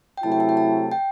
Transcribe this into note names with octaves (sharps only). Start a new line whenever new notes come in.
G5
C3 F#3 A3 E4 A5
G5
A5
G5
A5
G5